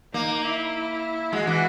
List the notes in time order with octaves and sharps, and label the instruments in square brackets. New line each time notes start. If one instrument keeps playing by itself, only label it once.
[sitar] A#3 [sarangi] D#4
[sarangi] E4
[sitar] G#3 [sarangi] F#4
[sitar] E3